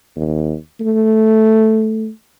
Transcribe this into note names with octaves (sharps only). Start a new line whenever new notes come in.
D#2
A3